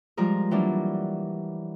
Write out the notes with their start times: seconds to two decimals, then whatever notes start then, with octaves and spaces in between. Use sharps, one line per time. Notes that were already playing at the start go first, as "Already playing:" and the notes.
0.17 F3 G3 G#3 A#4
0.51 E3 F#3 G3 A#3 D4